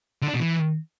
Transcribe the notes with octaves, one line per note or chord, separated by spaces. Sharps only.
D3
D4
B2
E3